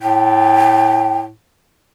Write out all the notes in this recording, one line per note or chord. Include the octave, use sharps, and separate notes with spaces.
A2 G5